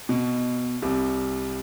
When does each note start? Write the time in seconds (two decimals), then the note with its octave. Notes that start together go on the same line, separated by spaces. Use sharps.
0.09 B2
0.82 C2 C3